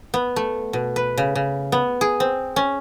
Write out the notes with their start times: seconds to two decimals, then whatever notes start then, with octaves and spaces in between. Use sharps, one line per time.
0.14 B3
0.36 A3
0.73 B2
0.96 B4
1.18 C#3
1.35 C#3
1.72 B3
2.01 G#4
2.20 C4
2.56 C#4